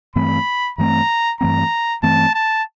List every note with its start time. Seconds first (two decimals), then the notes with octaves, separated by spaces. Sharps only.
0.15 G2 E3 A3 C4 B5
0.78 G2 E3 A3 C4 A#5
1.41 G2 E3 A3 C4 A#5
2.03 G2 E3 A3 C4 A5
2.35 A5